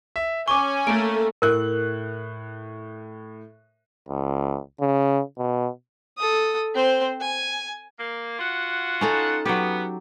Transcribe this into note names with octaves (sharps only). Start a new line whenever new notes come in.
E5
C#4 G#5 C#6 D6 G7
A3 A#3 D7
A2 A#4 F#6
C#2
C#3
B2
A4 D#6
C4 C5
G#5
A#3
F4 F#4 F#5
C#4 D#4 A4
F#3 B3 G4